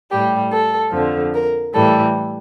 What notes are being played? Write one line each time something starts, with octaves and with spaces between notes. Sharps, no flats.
A2 G3 G4
A4
F2 D3 F3
A#4
A2 E3 G3 A4